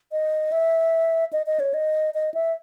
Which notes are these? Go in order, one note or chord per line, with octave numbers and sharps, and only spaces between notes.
D#5
E5
D#5
D#5
C#5
D#5
D#5
E5